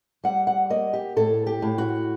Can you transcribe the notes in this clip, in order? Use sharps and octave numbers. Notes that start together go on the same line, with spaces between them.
G3 F#5
F#5
A#3 D#5
G4
A2 A4
G4
A2
F#4